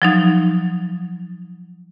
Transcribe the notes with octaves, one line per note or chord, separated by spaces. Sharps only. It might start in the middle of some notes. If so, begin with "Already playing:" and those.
F3 F#3 D#4